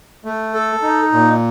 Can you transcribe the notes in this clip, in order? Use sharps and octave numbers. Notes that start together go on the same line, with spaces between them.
A3
A4
D#4
A#2